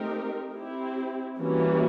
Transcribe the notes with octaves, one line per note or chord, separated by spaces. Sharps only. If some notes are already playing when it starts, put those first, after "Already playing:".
Already playing: A3 C4 D#4 G4 A#4
C4 E4 G4
E3 G3 A#3 C#4 F#4